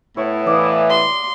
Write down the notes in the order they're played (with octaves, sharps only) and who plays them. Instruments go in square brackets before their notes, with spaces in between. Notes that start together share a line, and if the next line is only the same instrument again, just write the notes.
[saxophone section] A2 B3 E4 [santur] C#5
[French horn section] E3 [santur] D5 F5 D#6
[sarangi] C6